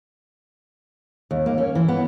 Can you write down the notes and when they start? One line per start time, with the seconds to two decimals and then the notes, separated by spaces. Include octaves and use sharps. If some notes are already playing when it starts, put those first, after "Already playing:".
1.31 D#2
1.46 A#3
1.58 C#4
1.75 E3
1.88 B3